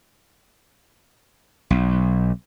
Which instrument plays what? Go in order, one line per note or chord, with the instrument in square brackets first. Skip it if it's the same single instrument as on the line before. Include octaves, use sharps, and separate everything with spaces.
[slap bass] B1